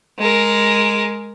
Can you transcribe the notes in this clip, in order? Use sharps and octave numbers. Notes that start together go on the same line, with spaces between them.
G#3 A#4